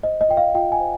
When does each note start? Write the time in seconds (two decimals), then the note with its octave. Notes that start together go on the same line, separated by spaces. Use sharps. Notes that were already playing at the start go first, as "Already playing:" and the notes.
0.03 C5 D#5
0.21 D#5
0.29 F4 G5
0.37 F5
0.55 F4 G5
0.72 G#5
0.80 C5